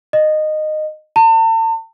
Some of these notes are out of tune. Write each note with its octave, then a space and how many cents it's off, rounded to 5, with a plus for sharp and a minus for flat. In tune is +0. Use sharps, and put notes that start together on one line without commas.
D#5 -15
A5 +40